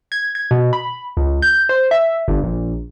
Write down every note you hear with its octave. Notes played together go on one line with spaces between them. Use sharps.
G#6
G#6
B2
B5
C#2
G6
C5
E5
G1
A#1